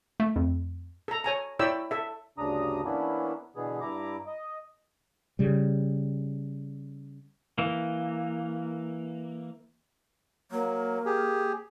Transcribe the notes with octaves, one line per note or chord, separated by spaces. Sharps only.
A3
F2
A4 A#5
C#5 G#5 A#5
E4 C#5 D5 G5 B5 E6
A4 E5
D2 G2 C#3 D4 A#5 D#6
E3 A#3 B3 C#4 D4 E4
B2 D3 E3 B3 G#4
G2 E4 A#5 D6
D#5
C#3 G3
E3 A#3
F#3 A#3
G4 G#4